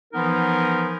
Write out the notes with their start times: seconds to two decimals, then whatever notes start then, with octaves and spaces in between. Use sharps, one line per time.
0.13 E3 F3 B3 D#4 A#4